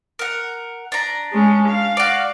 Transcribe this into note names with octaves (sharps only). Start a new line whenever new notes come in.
A#4 F#5
D4 A#5
G#3 C#4
F5
F#4 D5